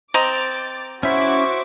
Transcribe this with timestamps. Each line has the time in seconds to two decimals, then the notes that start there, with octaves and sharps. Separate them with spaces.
0.14 C4 D#5 A#5 D6 A6
1.03 C#4 E4 F#4 C5 E5 C#6 D6